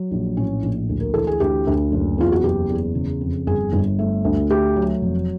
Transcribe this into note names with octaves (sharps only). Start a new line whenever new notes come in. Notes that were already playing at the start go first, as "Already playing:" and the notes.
Already playing: F#3
A#1
A2 C#4
A#1
D2
A#4
E3 A4
G#4
D2 G4
D2
F#1
E2 F4
F#4
F#1 G4
E2
C#3
F2
G1 G#4
G1
A3
D2
A3 G4
F#3
F1